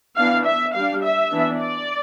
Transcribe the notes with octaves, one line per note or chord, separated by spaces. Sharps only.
E3 B3 D4 F5
E5
G3 D4 F5
E5
E3 B3 D4
D5